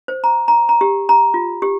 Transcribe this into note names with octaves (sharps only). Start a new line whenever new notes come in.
C5
A#5
A#5
A#5
G4
A#5
F4
G4